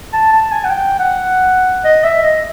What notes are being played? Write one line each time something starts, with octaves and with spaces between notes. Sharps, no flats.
A5
A5
G#5
F#5
G5
F#5
D#5
E5
D#5